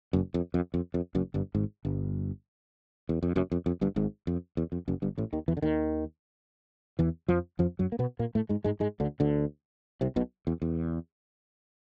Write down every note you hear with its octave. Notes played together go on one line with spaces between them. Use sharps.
F#1 F#2
F2
F2
F2
F2
F#1 F#2
G1 G2
G#1 G#2
G1 G2
E2
F2
F#1 F#2
F2
F2
G1 G2
G#1 G#2
F2
E2
F2
F#1 F#2
G1 G2
A1 A2
D#2 D#3
E2 E3
D3
D#2 D#3
E2 E3
F2 F3
F2 F3
F#2 F#3
A#3
B2 B3
A#2 A#3
A2 A3
G#2 G#3
G#2 G#3
G#2 G#3
D2 D3
D2 D3
C2 C3
B1 B2
E2
E2